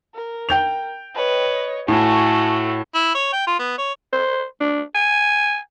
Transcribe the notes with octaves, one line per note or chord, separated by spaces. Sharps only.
A#4
G5 G6 F7
B4 C#5 D#5
A2 A3 F#4 G#5 A5
E4
C#5
G5
F4
B3
C#5
C5
D4
G#5